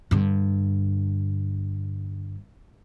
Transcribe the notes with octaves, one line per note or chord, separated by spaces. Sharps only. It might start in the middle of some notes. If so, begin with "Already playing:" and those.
G2 D3